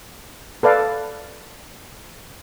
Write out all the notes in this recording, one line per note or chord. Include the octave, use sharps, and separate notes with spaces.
A4 B4 D5 F5